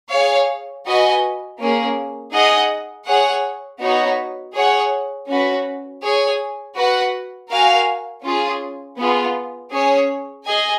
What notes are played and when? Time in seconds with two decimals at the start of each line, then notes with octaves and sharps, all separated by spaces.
0.10 G#4 C#5 F5
0.85 F#4 B4 D#5 G#5
1.59 A#3 C#4 G#4
2.32 D#4 G#4 D#5 F#5
3.06 G#4 C#5 F#5
3.80 B3 D#4 F#4 C#5
4.54 G#4 C#5 F#5
5.28 C#4 F#4 B4
6.02 G#4 C#5 G#5
6.76 F#4 B4 F#5
7.49 F#4 A#4 F5 G#5
8.23 C#4 F4 G#4
8.97 B3 F4 G#4
9.72 C#4 G#4 C#5
10.45 G#4 D#5 G#5